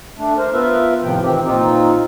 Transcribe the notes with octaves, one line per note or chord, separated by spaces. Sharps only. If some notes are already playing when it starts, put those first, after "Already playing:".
A3 D4
A#4 C5
B3 F4 A#4 B4 E5
A2 C3 D#3 F3 G5
D#3 E3 C4 G4
A#2 C4 D#4 F4